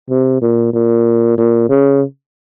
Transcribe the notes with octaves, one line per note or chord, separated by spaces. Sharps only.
C3
A#2
A#2
A#2
C#3